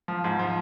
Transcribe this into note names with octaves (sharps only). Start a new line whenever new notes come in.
F3
G#2
F3